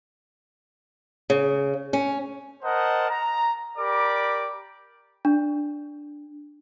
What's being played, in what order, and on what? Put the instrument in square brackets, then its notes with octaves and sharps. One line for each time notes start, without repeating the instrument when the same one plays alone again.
[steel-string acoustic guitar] C#3
C#4
[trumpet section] A#4 C5 D#5 F#5 A5
A#5
G4 A#4 D5 B5 D6
[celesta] D4